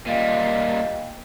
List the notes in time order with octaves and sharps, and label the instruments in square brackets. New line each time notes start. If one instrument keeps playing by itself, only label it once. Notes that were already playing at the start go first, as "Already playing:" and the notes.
[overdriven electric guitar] A#2 G3 [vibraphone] D#5 F5 G5